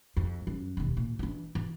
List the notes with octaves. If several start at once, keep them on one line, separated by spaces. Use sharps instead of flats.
F2
F#2
E1 D#2
A#2
E3 D4
E3